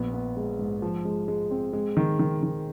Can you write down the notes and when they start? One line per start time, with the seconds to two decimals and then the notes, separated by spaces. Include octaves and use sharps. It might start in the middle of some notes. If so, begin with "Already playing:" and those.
Already playing: A#1 B3
0.13 B3
0.37 G#3
0.59 G#2
0.82 F3
1.05 G#3
1.28 G#3
1.51 C4
1.73 G#3
1.97 D#3
2.19 D#3
2.43 D#3